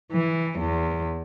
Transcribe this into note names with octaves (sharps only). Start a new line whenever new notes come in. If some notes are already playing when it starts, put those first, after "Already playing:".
E3
E2